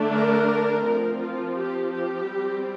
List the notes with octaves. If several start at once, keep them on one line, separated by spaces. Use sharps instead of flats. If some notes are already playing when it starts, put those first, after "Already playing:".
Already playing: D3 A3 D4
A#4
F3 C4 A#4
F4
G4
G4
G3 C4